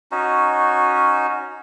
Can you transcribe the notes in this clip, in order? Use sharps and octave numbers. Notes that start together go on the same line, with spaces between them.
C#4 D#4 F#4